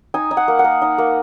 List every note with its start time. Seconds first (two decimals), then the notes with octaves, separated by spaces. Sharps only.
0.14 D#4 G#5
0.31 D#4
0.37 F#5
0.48 A#3
0.59 F#5
0.64 A#3
0.82 D#4
0.98 A#3